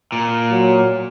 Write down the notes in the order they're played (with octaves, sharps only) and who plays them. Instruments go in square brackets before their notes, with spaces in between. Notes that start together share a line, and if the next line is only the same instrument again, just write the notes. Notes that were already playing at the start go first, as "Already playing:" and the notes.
[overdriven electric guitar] A#2
[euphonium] F#3